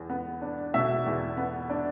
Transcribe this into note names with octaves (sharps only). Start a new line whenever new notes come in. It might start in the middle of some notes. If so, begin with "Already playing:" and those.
Already playing: E2
B3
D4
B2 E5
E2
B3
D4